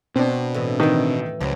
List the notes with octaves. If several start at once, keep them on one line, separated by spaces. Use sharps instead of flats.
B2 C4 D4
A2 E3 D#5
F#2 D#3 E3
C#2 F3 F#3